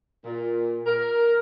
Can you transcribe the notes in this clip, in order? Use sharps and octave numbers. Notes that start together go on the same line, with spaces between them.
A#2
A#4